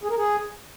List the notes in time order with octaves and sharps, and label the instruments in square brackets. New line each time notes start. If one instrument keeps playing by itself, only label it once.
[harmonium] G#4
A#4
G#4